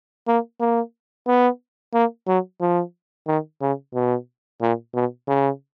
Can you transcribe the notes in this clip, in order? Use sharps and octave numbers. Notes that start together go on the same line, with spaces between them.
A#3
A#3
B3
A#3
F#3
F3
D#3
C#3
B2
A#2
B2
C#3